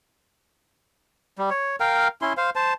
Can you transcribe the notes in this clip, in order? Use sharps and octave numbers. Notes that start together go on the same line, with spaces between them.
G3
C#5
A#4 F5 G5
C#4 E4 C6
C5 F5
C5 A5